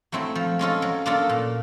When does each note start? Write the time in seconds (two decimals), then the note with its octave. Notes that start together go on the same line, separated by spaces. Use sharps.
0.12 F#3 A3 C4 E4
0.35 F3
0.59 G#3 C#4 F4 A4
0.82 F#3
1.06 A#3 D4 F4 A4
1.29 A#2